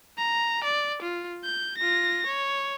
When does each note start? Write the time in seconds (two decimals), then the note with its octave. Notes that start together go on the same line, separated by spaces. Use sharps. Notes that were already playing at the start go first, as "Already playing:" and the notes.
0.18 A#5
0.64 D5
1.02 F4
1.44 G6
1.78 F4 A#6
2.26 C#5